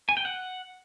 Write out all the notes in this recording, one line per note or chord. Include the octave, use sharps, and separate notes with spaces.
G#5
G5
F#5